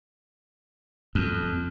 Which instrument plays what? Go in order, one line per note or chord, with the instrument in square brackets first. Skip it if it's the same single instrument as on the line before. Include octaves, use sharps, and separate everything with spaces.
[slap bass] F2